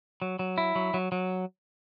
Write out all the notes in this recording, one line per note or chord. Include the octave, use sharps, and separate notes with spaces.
F#3
F#3
E4
F#3
F#3
F#3